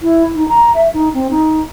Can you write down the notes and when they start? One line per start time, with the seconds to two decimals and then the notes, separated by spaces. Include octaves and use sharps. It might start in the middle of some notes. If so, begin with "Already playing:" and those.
0.01 E4
0.35 D#4
0.49 A#5
0.75 E5
0.94 D#4
1.14 C4
1.31 D#4